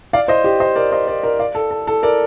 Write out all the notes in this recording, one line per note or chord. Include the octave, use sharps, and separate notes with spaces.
D5 F5
C5 D#5
G4
C5 D#5
A#4 D5
C5 D#5
A#4 D5
A#4 D5
D5 F5
A4
A4
A4
A#4 D5